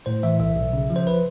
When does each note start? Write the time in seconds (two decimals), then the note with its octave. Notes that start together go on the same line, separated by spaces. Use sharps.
0.06 A2 C5
0.23 E3 E5
0.40 B1 E5
0.57 B1
0.73 C#3
0.90 F3
0.96 C5
1.07 B4